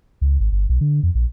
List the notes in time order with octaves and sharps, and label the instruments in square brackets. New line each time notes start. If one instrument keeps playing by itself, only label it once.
[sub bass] C#2
G#1
G1
B1
D3
F2
A#1